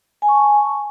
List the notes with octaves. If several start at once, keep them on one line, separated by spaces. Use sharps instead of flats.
G#5
C#6
A5